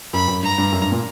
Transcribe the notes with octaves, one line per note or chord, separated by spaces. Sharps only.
F#2 B5
F#2
G2 A#5
G2
F#2
G2
A#2